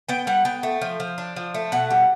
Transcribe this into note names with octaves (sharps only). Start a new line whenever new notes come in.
B3 G5
G3 F#5
B3 G5
A3
F3
F3
D4
F3
A3
B2 F#5
G3